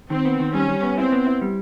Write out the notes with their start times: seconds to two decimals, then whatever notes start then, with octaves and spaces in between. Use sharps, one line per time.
0.10 D#3 C4
0.25 B3
0.40 D#3
0.54 G3 C#4
0.68 G3
0.83 B3
0.98 C4 E4
1.12 B3
1.27 E4
1.41 G3